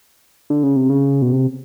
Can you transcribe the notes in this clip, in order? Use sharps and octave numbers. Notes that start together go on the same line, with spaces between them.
D3
C#3
C3
C#3
B2
C3